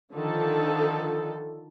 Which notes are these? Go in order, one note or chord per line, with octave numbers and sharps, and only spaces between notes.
D3 D#3 F3 A4